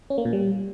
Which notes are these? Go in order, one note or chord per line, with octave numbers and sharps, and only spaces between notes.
C#4
A#3
A#2
G3